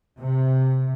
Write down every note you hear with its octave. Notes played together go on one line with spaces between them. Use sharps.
C3